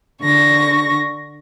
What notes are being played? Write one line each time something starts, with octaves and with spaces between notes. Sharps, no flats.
D3 C#6 A#6